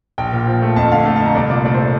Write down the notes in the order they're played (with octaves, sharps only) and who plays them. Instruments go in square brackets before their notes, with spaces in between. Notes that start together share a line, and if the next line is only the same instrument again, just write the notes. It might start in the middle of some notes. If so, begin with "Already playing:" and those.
[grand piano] A#1 G5
A#2
F3
A3
F2 A5
D3 F5
A3 F5
A5
F2 A#5
C2 D5
A#2 D5
A3 D5
C5